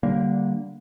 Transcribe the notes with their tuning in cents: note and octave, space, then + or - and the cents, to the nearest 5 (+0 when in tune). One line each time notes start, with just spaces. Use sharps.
D3 -5 G3 -20 A#3 +0